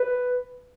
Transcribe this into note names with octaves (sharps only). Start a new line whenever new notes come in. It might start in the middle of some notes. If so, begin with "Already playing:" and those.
Already playing: B4